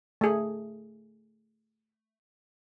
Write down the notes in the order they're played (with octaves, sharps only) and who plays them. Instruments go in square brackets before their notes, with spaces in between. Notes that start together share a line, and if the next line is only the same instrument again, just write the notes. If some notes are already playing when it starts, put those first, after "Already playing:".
[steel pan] A3 G#4